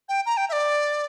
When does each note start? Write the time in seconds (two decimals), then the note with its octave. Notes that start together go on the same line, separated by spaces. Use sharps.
0.09 G5
0.26 A#5
0.37 G5
0.49 E5
0.52 D5